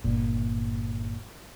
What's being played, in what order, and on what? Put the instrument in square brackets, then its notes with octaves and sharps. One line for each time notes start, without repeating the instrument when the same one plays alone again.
[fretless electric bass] G1 A#2